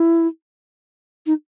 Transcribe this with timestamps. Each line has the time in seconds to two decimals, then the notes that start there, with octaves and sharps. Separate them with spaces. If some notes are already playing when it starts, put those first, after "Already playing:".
Already playing: E4
1.26 D#4